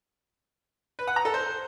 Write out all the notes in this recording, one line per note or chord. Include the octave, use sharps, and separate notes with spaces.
B4
F#5
A#5
A4
C5